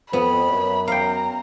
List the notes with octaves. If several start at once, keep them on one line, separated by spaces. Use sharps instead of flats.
F2 B3 B5
F#2
F5 G5 A#5